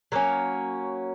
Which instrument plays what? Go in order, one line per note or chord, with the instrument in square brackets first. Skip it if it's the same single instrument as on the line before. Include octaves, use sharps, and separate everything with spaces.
[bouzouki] F#3 A#3 C#4